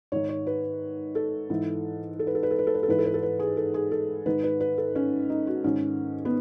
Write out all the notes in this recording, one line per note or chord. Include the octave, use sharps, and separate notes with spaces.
G#2 D#3 C#5
C#5
B4
A4
G#2 E3
A4
B4
A4
B4
A4
B4
A4
B4
A4
G#2 E3 B4
A4
B4
A4
B4
G#4
A4
G#4
A4
G#2 D#3 B4
B4
B4
A4
C#4
D#4
F#4
G#2 D#3 C#4
B3